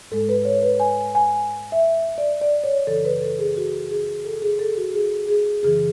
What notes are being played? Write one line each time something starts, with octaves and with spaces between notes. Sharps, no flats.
G#2 G#3 A4
B4
C#5
B4
G#5
G#5
E5
D5
D5
C#5
F#2 C#3 E3 A4
B4
A4
G#4
F#4
G#4
A4
G#4
A4
F#4
G#4
G#4
F#2 C#3 E3 G#4